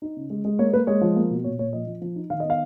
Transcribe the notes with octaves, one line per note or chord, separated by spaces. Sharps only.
D#4
C#3
G#3
G#3
A#3 C#5
A#3 B4
G#3 C#5
F3
A#3
B2
A#2 C#5
A#2 C#5
F3 D#5
F3
F3
D#4
D#3 F5
B3 D#5
F5